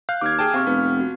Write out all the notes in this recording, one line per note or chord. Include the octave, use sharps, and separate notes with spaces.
F5 F#6 G6
D#2 D6 F6 G#6
G#4 G5 A5
C3 C4 F5 C#6 F6
F1 B3
F#4